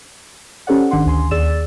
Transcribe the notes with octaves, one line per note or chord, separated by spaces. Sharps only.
C#4 G4 A4 C5 D5 F#5
G#1 D#3 D4 F#5 C6
D2 G#5 C6
D#2 G#4 D5 E6 A6 E7